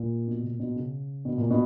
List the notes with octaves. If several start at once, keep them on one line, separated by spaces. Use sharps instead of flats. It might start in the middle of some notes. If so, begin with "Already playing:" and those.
Already playing: A#2
B2
A#2
B2
C#3
B2
A#2
B2